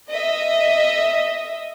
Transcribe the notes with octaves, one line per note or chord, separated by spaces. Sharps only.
D#5 E5